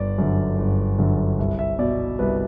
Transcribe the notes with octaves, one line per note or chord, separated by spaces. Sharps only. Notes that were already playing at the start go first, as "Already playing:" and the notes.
Already playing: G1 D5
F#2 D3
G1
F#2 D3
C2 E5
E5
B2 D5
C2 B4